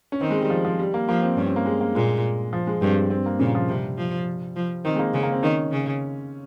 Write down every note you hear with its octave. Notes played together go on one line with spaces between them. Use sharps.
C#4
D#3 C4
G#3
G3
F3
F3
G3
A#3
F3 A#3
C4
G2 C#4
C4
A#3
G#3
A#3
A#2 G#3
F3
G#3
G2 C4
C4
A#3
A#2 C#3
F3
C3 G3
F3
F3
D#3 C4
G#3
A#3
C#3 G#3
A#3
C4
D#3 C#4
C#3